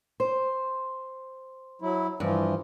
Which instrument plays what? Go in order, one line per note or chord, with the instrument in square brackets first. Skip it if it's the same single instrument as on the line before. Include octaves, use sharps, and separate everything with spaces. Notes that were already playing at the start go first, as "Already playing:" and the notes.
[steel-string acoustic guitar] C5
[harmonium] F#3 E4
[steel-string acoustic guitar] G2 [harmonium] E3 F3